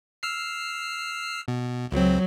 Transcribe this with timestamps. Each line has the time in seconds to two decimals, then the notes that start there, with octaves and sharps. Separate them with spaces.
0.23 E6 F6 C7
1.48 B2
1.92 C#2 F#3 C4